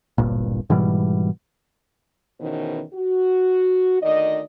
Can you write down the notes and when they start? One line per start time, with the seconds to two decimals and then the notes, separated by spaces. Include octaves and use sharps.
0.18 D1 G1 G2 A#2
0.70 G#2 B2 E3 G3
2.40 E2 B2 D#3 E3 C#4 C5
2.94 F#4
4.01 D2 D#3 D5 D#5